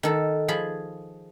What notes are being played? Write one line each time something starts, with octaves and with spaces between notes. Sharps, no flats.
D#3 A4
F3 G#4 B5